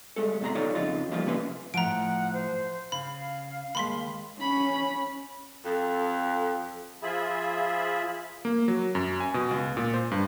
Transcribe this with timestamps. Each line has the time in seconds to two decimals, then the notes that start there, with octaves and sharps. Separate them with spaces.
0.16 G3 G#3 A4
0.41 C2 F#2 B2 A5 A#5 C6
0.55 D#4 F4 G4 A4 C#5 D5
0.75 F2 C#3 D#4 F4
1.11 F3 G3 A3 A#3 F4
1.26 C3 A#3 C#4 F4 B4
1.74 A2 F3 F#5 A#5 D7
2.33 C5
2.92 C#3 F5 B5
3.75 D#2 G#3 B5 C6 B6
4.41 C#4 B5
5.65 F2 A4
7.02 F3 F4 G#4 E5 B5
8.45 A#3
8.68 F#3
8.95 F#2
9.20 G#5
9.34 B2
9.51 C#2
9.77 A#2
9.94 C5
10.11 G2